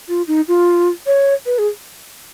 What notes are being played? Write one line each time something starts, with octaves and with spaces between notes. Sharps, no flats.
F4
D#4
F4
C#5
B4
G#4